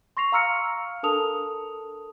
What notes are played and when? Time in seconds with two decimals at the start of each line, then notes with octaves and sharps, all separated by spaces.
0.17 C6 C#6 A#6 C7 F7
0.32 F5 A#5 E6 F6 C#7
1.03 D4 A4 A#4 A5 D#6 F7